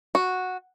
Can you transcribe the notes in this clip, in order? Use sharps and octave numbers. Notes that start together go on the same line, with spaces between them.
F#4